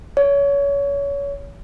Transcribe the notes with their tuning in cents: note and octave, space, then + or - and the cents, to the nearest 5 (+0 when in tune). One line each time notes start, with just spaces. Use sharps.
C#5 +25